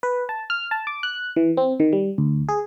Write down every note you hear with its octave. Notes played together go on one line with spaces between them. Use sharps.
B4
A5
F6
A5
D6
F#6
E3
C4
D#3
G3
D2
G#4